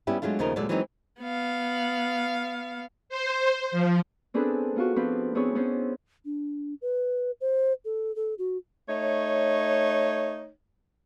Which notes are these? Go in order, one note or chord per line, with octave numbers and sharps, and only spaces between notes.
G3 B3 C#4 E4 G4
F#3 G#3 A3 D4 F4
D#2 C#3 F3 A3 D#4 A#4
D2 A#2 F#3 G#3 A4 D5
E3 F#3 G#3 B3 C4 D#4
B3 F5
C5
F3
B3 C4 D4 G#4 A4 B4
B3 F4 F#4
F3 B3 C4 D4 F4 B4
B3 C4 D4 E4 G#4 C#5
B3 C#4 C5
D4
B4
C5
A4
A4
F#4
A3 D#4 C#5